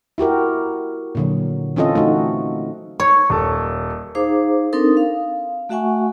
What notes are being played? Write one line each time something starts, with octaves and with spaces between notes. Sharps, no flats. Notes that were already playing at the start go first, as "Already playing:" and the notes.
E4 F#4 G4 A#4
A#2 D3 F#3
E3 C4 C#4 F4 A4 D#5
A3 D#4 F#4
C#5 C#6
D#1 A4
D#4 G#4 C5 F5 A#5 D6
C4 D4 D#4 A4 A#4 D#6
F5
A3 F#4 E5 F#5 G#5 C#6